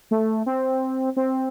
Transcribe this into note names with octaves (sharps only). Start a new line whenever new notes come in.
A3
C4
C4